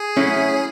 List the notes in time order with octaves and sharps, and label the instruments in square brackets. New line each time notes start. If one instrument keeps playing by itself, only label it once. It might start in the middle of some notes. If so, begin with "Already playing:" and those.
Already playing: [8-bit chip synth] G#4
[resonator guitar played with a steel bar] F#3 A3 C#4 E4